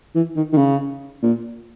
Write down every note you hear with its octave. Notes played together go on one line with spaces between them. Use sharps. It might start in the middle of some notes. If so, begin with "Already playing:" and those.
E3
D#3
D#3
C#3
A#2